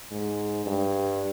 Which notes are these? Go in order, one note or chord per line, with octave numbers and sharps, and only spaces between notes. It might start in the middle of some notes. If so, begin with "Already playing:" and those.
G#2
G2